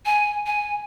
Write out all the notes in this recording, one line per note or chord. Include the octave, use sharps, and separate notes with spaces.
G#5
G#5